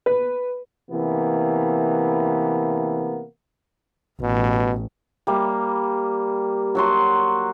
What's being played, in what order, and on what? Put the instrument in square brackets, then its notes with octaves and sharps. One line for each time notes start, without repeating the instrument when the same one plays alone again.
[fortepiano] B4
[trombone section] C3 E3 A#3 B3
[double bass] A1 [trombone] B2
[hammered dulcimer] G3 A#3
F#3 F#4 C6